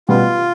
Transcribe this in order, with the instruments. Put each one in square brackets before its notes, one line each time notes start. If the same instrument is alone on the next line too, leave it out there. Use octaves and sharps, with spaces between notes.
[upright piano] B2 G3 B3 [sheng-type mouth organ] F4